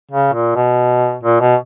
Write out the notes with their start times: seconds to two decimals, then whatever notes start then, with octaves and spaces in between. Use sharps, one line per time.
0.11 C#3
0.33 A#2
0.56 B2
1.23 A#2
1.40 B2